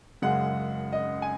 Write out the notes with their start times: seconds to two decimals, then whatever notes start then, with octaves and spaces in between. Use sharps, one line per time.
0.22 F#1 F#2 C#3 G#3 F#5
0.92 D#5
1.22 G#5